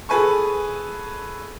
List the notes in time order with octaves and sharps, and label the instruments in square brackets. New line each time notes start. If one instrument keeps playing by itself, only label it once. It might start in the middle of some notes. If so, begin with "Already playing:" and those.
[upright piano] G#4 A4 B4 G#5 C#6